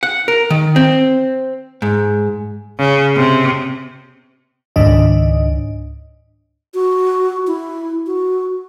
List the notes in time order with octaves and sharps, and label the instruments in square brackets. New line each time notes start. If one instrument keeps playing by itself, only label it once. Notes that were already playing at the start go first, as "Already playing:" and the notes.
[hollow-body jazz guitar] F#5
A#4
D#3
C4
G#2
[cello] C#3
C3
[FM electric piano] C#2 G#2 D#3 D4 D#5
[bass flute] F#4
E4
F#4